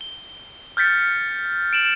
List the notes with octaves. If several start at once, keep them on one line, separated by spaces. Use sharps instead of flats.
G7
F6 G6 A6 B6 C#7
D7 E7 F#7